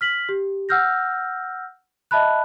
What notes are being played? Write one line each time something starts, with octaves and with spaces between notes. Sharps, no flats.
F6 B6 F#7
G4
F#5 E6 F6 G6 A#6
D#5 E5 A5 B5 F#6